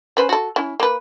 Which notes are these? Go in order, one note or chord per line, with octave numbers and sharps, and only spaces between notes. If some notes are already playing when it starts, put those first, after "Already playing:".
C#4 B4 C5
F#4 A4
C#4 E4
A#3 B4